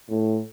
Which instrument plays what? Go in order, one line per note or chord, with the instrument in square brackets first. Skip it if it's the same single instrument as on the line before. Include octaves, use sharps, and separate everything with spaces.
[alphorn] A2